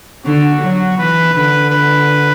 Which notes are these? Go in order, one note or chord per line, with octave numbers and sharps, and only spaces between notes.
D3 F#4
F#3
E3 B4
D3 B4
B4